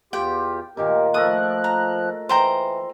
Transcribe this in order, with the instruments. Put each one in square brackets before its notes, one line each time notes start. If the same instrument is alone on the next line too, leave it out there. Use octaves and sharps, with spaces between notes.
[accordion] E2 F4 G4 [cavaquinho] G5
[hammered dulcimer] A#2 D#3 D#4 [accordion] A#3 G4 A#4
[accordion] F3 F#6 [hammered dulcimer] A3 A4 A#4 [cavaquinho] D#6
[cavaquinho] A#5
[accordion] E3 [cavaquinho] C5 G5 A#5